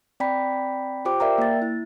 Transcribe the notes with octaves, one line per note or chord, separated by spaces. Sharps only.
C4 D5 G5 A#5 B5 B6
F4 G4 C5 G5 D6
A#4 D5 E5 F5 G5 A#5
A#3 A6
E4